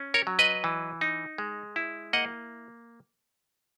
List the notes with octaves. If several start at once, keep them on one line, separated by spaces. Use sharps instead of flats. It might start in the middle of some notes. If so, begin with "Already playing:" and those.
Already playing: C#4
A#4 C#5
F#3
B4 D#5
E3
D#4
G#3
E4
A#3 D#5 F#5